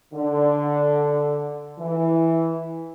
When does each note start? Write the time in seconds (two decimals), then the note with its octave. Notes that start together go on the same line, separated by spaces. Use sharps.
0.14 D3
1.78 E3